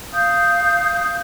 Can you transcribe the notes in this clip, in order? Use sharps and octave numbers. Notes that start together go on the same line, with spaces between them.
F5 D#6 G6